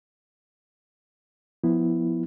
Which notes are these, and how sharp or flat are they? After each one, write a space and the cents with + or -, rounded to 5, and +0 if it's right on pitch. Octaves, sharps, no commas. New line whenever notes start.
F3 +0 B3 +0 E4 +0